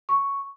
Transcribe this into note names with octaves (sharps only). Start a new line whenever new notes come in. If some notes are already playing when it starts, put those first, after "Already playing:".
C#6